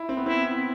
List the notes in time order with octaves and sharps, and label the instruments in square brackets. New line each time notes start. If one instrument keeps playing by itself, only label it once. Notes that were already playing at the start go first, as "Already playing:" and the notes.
Already playing: [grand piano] E4
C4
B3
[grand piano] C4 [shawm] E4